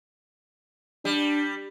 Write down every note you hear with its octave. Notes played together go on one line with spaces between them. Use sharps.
G3 D4